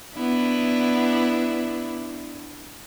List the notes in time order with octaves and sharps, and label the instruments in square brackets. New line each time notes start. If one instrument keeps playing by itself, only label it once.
[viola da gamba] B3 D4 E4